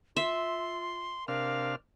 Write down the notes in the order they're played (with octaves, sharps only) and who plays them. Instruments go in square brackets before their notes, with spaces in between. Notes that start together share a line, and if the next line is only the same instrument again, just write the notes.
[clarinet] F4 [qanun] E5 [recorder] C6
[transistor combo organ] C3 D4 F6 [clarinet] A#4 [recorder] F5